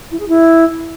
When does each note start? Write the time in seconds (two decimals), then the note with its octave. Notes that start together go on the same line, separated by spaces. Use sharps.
0.11 E4
0.20 G#4
0.28 E4